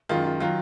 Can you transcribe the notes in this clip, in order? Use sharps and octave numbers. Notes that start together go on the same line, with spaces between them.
F#2 D#3 G#3 F4
F4
D#3 F#3 F4